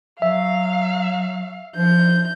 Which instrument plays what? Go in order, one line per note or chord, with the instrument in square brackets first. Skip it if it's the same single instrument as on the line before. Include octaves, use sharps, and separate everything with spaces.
[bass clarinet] F#3 [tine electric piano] E5 [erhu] F5
[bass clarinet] F3 [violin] G6